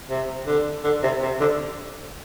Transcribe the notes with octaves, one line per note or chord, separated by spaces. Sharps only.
C3
D3
D3
C3
C3
D3